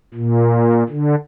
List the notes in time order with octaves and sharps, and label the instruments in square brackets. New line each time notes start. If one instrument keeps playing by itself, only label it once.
[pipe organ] A#2
D3